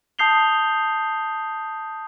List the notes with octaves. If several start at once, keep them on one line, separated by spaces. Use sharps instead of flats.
A5 D#6 G6 C7 F7 G7